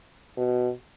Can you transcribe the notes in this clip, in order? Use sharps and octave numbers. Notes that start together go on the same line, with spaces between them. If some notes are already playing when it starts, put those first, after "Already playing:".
B2